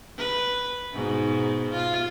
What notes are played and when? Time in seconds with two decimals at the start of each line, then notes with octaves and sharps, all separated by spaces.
0.18 B4
0.93 G#2 B2
1.73 F4